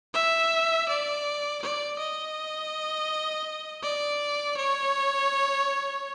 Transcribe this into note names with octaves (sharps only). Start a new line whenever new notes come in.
E5
D5
D5
D#5
D5
C#5